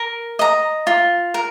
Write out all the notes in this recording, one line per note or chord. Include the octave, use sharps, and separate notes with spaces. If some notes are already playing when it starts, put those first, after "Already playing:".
Already playing: A#4
D#5 A#5
F4
A#4